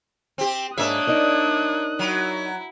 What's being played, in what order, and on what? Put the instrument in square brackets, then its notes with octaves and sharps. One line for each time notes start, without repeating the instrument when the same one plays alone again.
[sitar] C4 G4
[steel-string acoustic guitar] G#2 G#4 [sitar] A#3 E5 [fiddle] D4 C#5 [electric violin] D#6 F#6
[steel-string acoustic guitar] D#4 A#4 D5
[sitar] F#3 [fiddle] E4